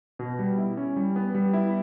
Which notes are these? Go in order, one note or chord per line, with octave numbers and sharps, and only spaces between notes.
B2
G3
E4
C#4
G3
B3
G3
E4